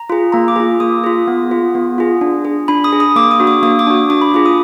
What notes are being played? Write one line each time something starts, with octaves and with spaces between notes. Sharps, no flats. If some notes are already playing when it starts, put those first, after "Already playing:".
Already playing: A#5
F4 G#4
A#3 A#5
D6
F4 G#4
A#3 D#6
F4 G#4
B3
F4 G#4
B3
F4 G#4
D4
G#4
D4 B5
D#6
G#4
D#6
A#3 D6
D#6
D4 F#4
D6
A#3 D#6
D6
D4 F#4
D4 D6
B5
F4 G#4 D6
D#6